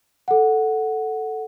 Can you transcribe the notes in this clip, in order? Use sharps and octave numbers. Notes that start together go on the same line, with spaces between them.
A4 F#5